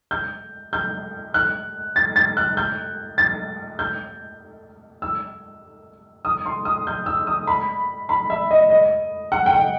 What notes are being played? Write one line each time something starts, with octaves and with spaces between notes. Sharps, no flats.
G6
G6
F#6
A6
A6
F#6
G6
A6
G6
E6
D#6
C6
D#6
G6
E6
D#6
B5
B5
E5
D#5
D#5
F#5
G5
F#5